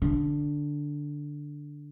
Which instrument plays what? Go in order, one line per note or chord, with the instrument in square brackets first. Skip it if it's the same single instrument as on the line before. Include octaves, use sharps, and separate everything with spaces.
[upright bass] D3